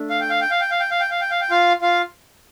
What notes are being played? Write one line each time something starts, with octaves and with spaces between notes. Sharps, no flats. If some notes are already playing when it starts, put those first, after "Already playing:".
Already playing: A3 D4
F5
G5
F5
G5
F5
G5
F5
G5
F5
G5
F5
G5
F5
G5
F4 F5
F4 F5